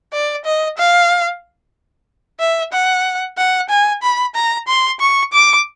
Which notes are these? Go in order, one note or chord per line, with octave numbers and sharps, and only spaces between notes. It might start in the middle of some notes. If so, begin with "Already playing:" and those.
D5
D#5
F5
E5
F#5
F#5
G#5
B5
A#5
C6
C#6
D6